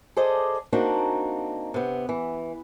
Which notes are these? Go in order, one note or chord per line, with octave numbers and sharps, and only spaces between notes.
G#4 A4 C5 D5 D#5
A#3 C4 D4 D#4 F#4
C3 B3
E3